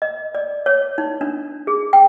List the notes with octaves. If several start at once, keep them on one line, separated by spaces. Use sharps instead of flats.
D#5
D5
C#5
D#4
D4
G#4
G5